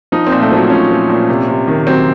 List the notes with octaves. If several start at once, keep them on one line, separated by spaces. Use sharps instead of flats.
F3 D#4
C4
A#2
A3
F3 F#3
A#2 C#4
F3
A#2
C3
C3
D#3
F#3 C4